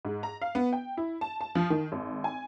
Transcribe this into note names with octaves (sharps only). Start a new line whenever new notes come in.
G#2
A#5
F5
B3
G5
E4
A5
A5
F3
D#3
G#1
G#5